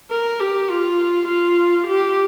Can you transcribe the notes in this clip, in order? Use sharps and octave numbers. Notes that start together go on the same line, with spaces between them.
A#4
G4
F4
F4
G4